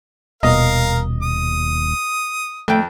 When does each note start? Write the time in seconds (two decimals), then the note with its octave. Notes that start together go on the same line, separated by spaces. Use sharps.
0.43 D#1 B2 A#4 D#5 F5
1.22 D#6
2.68 F2 A3 G5